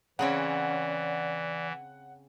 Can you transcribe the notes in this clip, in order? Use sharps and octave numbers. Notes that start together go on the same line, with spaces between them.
C#3 E3 C4 C#4 D5 F#5